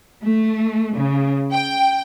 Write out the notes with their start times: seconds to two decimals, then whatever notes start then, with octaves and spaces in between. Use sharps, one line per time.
0.23 A3
0.94 C#3
1.51 G5